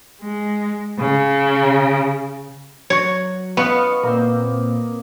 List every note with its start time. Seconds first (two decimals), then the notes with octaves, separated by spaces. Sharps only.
0.22 G#3
0.99 C#3
2.90 F#3 C#5
3.57 B3 D#5 F5 B5 C#6
4.03 A#2 A#3 C4